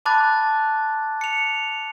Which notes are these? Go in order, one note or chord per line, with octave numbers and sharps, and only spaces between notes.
A5 B5 D6 F#6 A6
C#7 F7